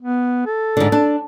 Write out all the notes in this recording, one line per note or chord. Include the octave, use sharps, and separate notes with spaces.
B3
A4
G#2 D3
D4